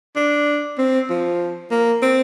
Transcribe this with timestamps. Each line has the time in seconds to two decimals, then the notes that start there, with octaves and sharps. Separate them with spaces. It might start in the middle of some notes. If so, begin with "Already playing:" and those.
0.16 D4
0.78 C4
1.10 F3
1.71 A#3
2.02 C4